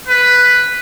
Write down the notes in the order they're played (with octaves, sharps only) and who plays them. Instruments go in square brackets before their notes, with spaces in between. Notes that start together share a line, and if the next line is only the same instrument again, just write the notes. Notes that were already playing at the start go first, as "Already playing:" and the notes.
[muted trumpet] B4